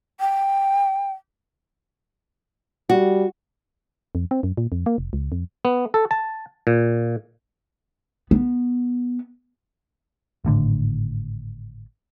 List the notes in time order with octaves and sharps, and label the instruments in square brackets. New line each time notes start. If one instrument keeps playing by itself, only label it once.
[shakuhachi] G5
[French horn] G3 [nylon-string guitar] F#4
[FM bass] F2
C4
F#2
A#2
F2
A#3
F1
C#2
F2
[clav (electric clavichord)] B3
A4
A5
A#2
[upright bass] B3
[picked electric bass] G#1 A2 D3